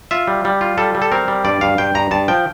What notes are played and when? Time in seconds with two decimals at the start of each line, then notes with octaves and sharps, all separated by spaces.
0.11 F4 E5
0.28 G3
0.45 G3
0.61 F4
0.77 G3 A4
0.95 G3
1.02 A4
1.12 C4 A#4
1.28 G3
1.45 G2 D5
1.61 G2 F5
1.78 G2 G5
1.95 G2 A#5
2.11 G2 A5
2.28 F3 G5